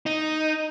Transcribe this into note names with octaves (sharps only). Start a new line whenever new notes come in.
D#4